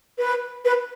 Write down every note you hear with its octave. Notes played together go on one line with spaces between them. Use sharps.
B4
B4